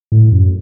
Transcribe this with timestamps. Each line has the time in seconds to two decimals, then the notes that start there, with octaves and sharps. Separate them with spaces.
0.12 A2
0.32 F#2